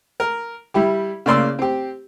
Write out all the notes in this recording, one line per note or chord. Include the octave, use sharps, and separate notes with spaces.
A#4
G3 E4 G4
C#3 A#3 D5 C6 E6
C4 G4